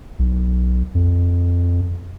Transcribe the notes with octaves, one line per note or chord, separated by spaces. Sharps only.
B1
F2